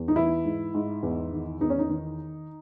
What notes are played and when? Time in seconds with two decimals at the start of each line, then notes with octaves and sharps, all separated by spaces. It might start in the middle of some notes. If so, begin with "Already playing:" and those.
Already playing: E2
0.08 D#4
0.16 E3 E4
0.45 G#2
0.74 G#2
1.03 E2
1.32 D#3
1.61 E2 D#4
1.70 C#4
1.79 D#4
1.89 D#3